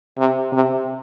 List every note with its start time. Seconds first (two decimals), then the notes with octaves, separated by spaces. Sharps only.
0.18 C3
0.52 C3